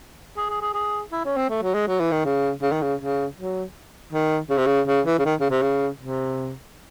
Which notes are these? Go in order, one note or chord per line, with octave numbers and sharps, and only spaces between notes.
G#4
G#4
G#4
G#4
E4
C#4
C4
A3
F#3
G#3
F#3
E3
D#3
C#3
C#3
D#3
C#3
C#3
F#3
D#3
C#3
C3
C#3
C#3
E3
C#3
D#3
C#3
C3
C#3
C3